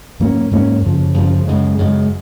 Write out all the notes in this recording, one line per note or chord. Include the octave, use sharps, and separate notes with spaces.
G#2 F#3 A#3 C#4
G#2 F#3 A#3 C#4
F#2 C#3 F3
F#2 C#3 F3
F#2 C#3 G#3
F#2 C#3 G#3